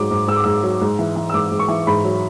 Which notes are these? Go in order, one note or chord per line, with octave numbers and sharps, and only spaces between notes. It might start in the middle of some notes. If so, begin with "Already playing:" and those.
Already playing: G#2 F#3 D6
G#2
G#2 E6
D6
G#2 E6
F#3
G#2
E3
E3
E6
G#2 D6
G#2
C#6
E3
G#2 B5
F#3